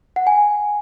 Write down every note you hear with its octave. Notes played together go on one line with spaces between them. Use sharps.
F#5
G#5